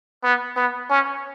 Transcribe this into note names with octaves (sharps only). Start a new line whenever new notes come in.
B3
B3
C#4